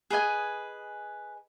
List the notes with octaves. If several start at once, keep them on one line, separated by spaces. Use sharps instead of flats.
G#4 B4 D#5 G#5